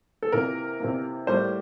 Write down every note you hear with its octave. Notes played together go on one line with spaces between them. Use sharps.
A4
C3 E3 A#3 A#4
C3 E3 A#3
A2 G3 A#3 C5